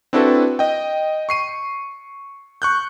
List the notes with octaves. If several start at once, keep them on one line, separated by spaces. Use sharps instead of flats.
C4 D4 E4 F#4 A4 B4
D#5 G5
C#6 C7 D#7
C#6 F#6 G6